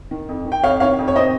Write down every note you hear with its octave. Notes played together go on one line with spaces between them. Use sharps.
D#3
F2
D#3
G5
F2 C#5 F5
C3 D#3 C#5 F5
F2
C#5
C3 D#3 C5 D#5